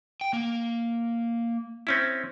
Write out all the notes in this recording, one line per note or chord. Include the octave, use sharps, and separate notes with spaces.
G5
A#3
C4 C#4 E4